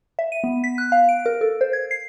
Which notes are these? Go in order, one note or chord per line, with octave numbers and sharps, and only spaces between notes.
E5
D#7
B3
B6
F#6
F5
D7
A#4
A4
C5
G#6
C7